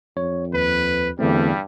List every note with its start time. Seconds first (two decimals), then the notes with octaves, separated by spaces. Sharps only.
0.17 F2 C#5
0.54 D#2 B4
1.19 E2 G2 D3 G3 A3 C4